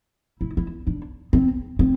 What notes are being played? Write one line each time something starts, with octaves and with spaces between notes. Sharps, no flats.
E4
E4
D4
C4
C4